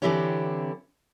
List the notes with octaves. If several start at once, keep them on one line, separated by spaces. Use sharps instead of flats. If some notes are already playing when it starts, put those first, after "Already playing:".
D3 E3 C4 E4 G4 C#5